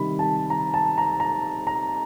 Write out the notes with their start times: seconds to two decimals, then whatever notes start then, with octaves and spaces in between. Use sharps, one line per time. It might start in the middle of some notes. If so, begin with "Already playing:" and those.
Already playing: C3 D#3 G3 C4 B5
0.19 A5
0.50 A#5
0.74 A5
0.98 A#5
1.20 A#5
1.67 A#5